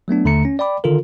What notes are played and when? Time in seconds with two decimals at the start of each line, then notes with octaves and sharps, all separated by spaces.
0.08 F#3 A3 B3 D4
0.25 D#2 D3 A3 A#5 C#7
0.45 C#4
0.59 D5 G5 B5 D6
0.84 D3 D#3 F4 A4 A#4